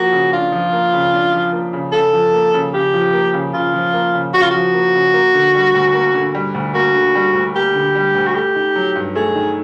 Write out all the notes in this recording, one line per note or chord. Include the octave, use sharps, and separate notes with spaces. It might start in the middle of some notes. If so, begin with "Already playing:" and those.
Already playing: F3 A#3 F#4
C#3
D4 F4
F3
A#3
C#3
D4
F3
A#3
C#3
C#3 A4
F3
A#3
C#3
C#3 G4
F3
A#3
C#3
C#3 F4
F3
A#3
C#3
C#3 F#4
F4
F3 F#4
A#3
C#3
A#3
D3
G3
D2
A#3
D3
G3
D2
A#3 F#4
D3
G3
D2
A#3 G4
D3
G3
D2
F#4
A3 G4
D#3
F#3
G2
A3 G#4
D#3